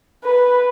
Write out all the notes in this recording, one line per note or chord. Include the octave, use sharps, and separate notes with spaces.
B4